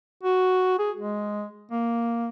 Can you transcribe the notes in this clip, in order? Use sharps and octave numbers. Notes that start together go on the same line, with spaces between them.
F#4
G#4
G#3
A#3